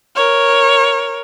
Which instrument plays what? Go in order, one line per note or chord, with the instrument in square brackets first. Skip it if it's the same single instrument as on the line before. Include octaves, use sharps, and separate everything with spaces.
[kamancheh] A#4 C#5